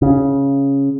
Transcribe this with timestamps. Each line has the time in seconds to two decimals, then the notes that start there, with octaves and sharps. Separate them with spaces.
0.02 C#3